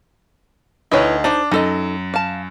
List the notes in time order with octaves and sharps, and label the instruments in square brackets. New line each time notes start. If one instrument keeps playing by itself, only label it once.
[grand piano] D2 D#4 [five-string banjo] E4 B4 C#5
[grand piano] D4 [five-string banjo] D#4 C5
[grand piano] F#2 [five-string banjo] D#4 A4 D#5
[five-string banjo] F5 A5